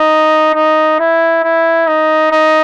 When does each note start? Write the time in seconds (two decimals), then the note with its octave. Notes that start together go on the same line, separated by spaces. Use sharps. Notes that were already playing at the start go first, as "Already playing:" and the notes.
Already playing: D#4
0.54 D#4
0.99 E4
1.44 E4
1.87 D#4
2.32 D#4